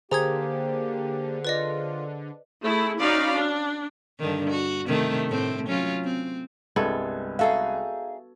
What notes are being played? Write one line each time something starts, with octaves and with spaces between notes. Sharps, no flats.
D3 A#3 G4 G#4 C5 A#5 D#6 G#6
F4 B4 D5 D#5
A3 E4 G#4
C#4 D#4 F#4 D5 F5 B5
D4
G2 D3 D#3
F#4
C3 D#3 A3
A2 C4
F#3 C#4 F4
C4
C2 G2 G#3 B3 A4 G#6
D#4 F#4 G#4 A4 E5 F5